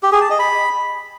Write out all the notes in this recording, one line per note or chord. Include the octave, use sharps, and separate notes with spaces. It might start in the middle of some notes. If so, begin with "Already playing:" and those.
G4
G#4
A5
D#5
B5